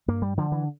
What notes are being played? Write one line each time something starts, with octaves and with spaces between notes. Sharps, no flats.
G2 A#3
G3
D3 F3
E3